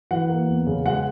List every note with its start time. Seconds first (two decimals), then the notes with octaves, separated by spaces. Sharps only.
0.11 E3 F#5
0.29 A#3
0.48 E2
0.66 C#3
0.86 G#3 F#5